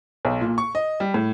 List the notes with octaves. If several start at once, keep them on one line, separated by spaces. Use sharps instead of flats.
B1
A#2
C#6
D#5
G3
A2